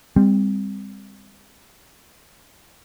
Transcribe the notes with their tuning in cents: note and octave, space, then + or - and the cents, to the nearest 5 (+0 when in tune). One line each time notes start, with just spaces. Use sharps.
G3 +30 C4 -5